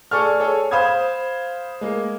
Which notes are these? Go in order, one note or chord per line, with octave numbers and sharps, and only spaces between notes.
G#4 A4 D5 C#6 F6
G#4 A4 C#5
C5 F5 B5 D#6 G#6
G#3 A#3